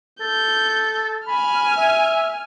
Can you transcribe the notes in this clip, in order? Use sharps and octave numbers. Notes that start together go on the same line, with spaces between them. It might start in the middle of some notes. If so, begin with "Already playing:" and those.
A4 G6
G#5 B5 F6
E5